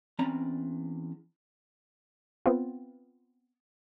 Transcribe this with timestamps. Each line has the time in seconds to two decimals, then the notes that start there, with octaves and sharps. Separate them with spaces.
0.19 E2 C4 C#4 D5 A#5 B5
2.46 B3 C4 F4